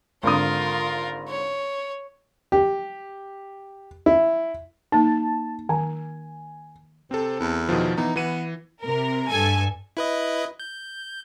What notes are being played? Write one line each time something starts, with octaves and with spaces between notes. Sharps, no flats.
G#1 D3 F4 A#4 D#6
C#5
G4
E4
A#3 D#4 A5
D#3 G#5
C3 C4 A4
E2
B2 D#3 F3
E3 B3 D#4
E3 B3 D#7
C3 A#4
G2 A4 G#5
E4 B4 D#5
G6